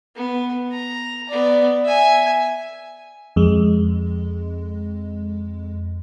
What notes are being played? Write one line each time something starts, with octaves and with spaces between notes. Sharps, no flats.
B3
A#5
B3 D5
E5 G#5
F2 G#3